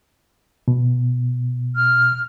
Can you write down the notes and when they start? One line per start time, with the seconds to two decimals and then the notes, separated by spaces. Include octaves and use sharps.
0.68 B2
1.76 F6